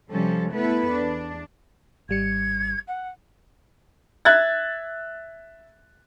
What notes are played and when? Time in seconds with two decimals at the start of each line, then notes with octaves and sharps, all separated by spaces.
0.11 C3 F3 G3 C#4 A4
0.51 A3 B3 E4 A4 B4
0.90 E2 D4
2.09 G#1 G3 G#6 C#7
2.88 F#5
4.25 E5 F#6 G#6 A6